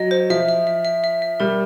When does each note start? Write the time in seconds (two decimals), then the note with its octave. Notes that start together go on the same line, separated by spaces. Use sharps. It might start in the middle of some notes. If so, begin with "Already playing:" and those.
Already playing: F#3 D#5
0.11 C5
0.30 F3 E5
0.48 E5
0.67 E5
0.85 E5
1.04 E5
1.22 E5
1.40 G3 A#4